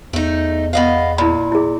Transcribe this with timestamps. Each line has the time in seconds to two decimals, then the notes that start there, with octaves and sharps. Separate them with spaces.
0.13 E2 A3 D#4
0.73 B3 D#5 F5
1.18 A#2 E4 B5
1.52 E4 G#4